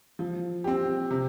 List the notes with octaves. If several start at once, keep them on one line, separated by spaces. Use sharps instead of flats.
F3
C4 G4
C3